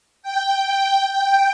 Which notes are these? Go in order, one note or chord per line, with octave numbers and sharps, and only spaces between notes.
G5
G5
G5